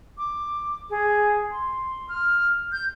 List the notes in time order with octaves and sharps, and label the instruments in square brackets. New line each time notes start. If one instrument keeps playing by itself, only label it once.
[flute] D6
G#4
C6
F6
G6